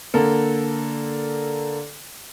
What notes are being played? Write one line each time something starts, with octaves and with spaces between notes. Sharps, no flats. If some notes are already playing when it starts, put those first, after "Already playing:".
D3 A#3 A4